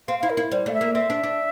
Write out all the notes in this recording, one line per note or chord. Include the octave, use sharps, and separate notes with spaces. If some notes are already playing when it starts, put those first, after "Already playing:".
C4 F5
E4 F5
A#4
E4
G3 C5
A3 F5
E5
A#3
C4 E5
D4
D4